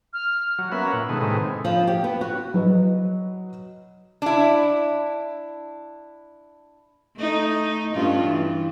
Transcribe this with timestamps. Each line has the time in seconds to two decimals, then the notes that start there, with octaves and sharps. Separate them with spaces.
0.13 F6
0.58 F#3
0.72 A#3 B3 C#4 E5 F#5
0.93 A#2
1.09 B2 D#3 G#3 A3
1.21 A2 C3 D#3 G#3 B3
1.65 F3
1.87 G4
2.04 B3
2.21 F#4
2.54 F#3 B4 D#5
4.22 D4 E4
7.17 A3 D#4
7.94 G2 C#4 F4
8.26 E3